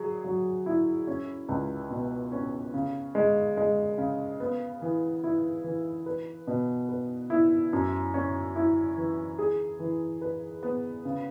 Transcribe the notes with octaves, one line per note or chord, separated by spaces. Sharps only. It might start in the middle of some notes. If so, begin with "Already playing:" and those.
Already playing: F#3 G#4
F#3
E4
C#4
C#2
B2
C#4
C#3
G#3
G#3
C#3
B3
E3
E4
E3
B4
B2
B4
E4
F#2
C#4
E4
E3
G#4
E3
B4
B3
C#3